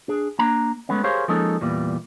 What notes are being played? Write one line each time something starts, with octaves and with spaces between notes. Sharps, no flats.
D4 G#4
A#3 D4 A#5
G#3 A3 B3 C#4
G4 G#4 A#4 C5 C#5 F5
F3 G#3 A#3 C#4 D#4 A4
E2 A#2 E3 G3